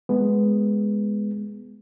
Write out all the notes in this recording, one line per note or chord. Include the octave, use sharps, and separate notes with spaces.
G#3 B3